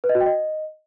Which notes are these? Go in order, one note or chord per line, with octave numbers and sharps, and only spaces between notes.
B4
D#5
F#4
G5
D#5